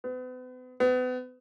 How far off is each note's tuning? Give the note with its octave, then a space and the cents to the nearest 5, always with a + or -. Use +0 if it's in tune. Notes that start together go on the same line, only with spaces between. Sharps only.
B3 +40
B3 +35